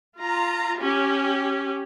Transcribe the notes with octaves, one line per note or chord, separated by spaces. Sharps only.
F4 A#5
C#4 G4